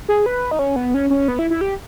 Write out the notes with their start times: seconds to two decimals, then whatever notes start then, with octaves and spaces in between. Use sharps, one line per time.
0.09 G#4
0.26 B4
0.51 D#4
0.59 C#4
0.76 B3
0.94 C#4
1.10 C#4
1.28 B3
1.39 E4
1.50 E4
1.61 G4